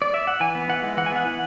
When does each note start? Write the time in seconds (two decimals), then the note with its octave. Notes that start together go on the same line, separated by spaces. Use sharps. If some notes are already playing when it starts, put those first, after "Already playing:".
0.02 D5
0.14 E5
0.27 F#5
0.40 E3 G#5
0.55 B3
0.69 E3 F#5
0.83 G#3
0.97 E3 F#5
1.06 G#5
1.11 B3 F#5
1.26 E3